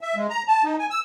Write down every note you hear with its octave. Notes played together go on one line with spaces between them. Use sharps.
E5
G#3
A#5
A5
D#4
G#5
E6